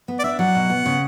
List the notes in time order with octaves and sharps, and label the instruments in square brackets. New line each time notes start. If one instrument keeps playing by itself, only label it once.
[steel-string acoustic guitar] B3
[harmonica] D5
[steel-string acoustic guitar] D4 [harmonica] E5
[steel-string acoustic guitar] F#3 [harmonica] F#5
[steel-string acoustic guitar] B2
B3
C#3